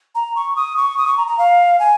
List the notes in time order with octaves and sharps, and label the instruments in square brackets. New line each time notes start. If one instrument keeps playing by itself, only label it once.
[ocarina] A#5
C#6
D#6
C#6
D#6
C#6
A#5
A#5
F5
G#5